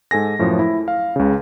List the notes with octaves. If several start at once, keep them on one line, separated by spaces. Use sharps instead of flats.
G#2 A4 G#5 A#6
F#2 A2 F3
E4
F5
C#2 C#3